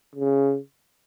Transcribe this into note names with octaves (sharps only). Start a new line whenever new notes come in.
C#3